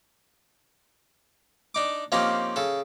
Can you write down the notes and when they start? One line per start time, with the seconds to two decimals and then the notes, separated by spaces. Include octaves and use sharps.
1.75 D4 D#4 D6
2.12 F3 A#3 C4 C#4 D#4 G4
2.56 C#3 A4